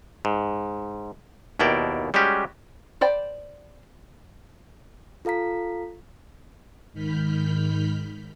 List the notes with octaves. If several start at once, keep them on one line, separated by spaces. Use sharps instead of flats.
G#2
D#2 B2 E4 A#4 D5 G5
G3 G#3 C#4 F#4 G4
C5 D5 G5 B5
F4 A4 F5 A#5 B6
G#2 D#3 B5 F6 G6 B6